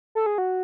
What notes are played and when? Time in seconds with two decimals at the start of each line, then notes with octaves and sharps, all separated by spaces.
0.15 A4
0.26 G#4
0.38 F#4